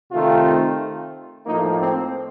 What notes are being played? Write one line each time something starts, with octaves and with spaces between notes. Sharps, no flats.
C3 D#3 A3 C4 F4
A2 F3 A#3 D#4
C4